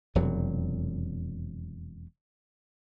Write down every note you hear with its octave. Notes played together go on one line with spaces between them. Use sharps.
E1 F2 C3 F#3